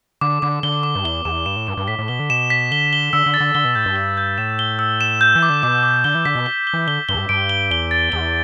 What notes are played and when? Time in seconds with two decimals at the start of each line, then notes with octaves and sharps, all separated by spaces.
0.21 D3 D6
0.42 D3 D6
0.63 D3 G7
0.83 D6
0.95 G2
1.05 E2 G7
1.25 E2 E7
1.46 G2 E7
1.56 A2
1.67 G2 E7
1.77 G2
1.88 A2 B6
1.99 A2
2.08 B2 G7
2.20 D3
2.30 B2 E7
2.50 B6
2.71 D3 G7
2.93 G7
3.13 D3 E6
3.26 D3
3.34 A6
3.40 D3
3.55 D3 G7
3.65 B2
3.75 A2 G6
3.86 G2
3.96 G7
4.17 G6
4.38 A2 E7
4.59 G7
4.79 E6
5.01 E7
5.21 G6
5.35 E3
5.42 D6
5.50 D3
5.63 B2 D6
5.83 D6
6.04 D3 G7
6.15 E3
6.25 D3 B6
6.35 B2
6.46 G7
6.67 G7
6.73 E3
6.87 D3 G7
7.09 G2 G7
7.14 E2
7.19 G2
7.29 G2 D7
7.49 G7
7.71 E2 G7
7.91 A6
8.12 E2 G7